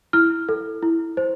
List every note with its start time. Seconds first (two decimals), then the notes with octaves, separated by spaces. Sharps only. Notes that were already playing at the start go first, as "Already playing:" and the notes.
0.13 E4 F6
0.49 A4
0.83 E4
1.17 C5